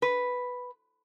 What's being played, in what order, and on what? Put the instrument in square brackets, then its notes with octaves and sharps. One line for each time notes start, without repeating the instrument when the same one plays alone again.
[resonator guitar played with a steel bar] B4